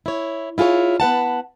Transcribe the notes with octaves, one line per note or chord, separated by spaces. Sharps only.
E4 C#5
E4 F4 G#4 A4 C#5
B3 B4 F#5 A5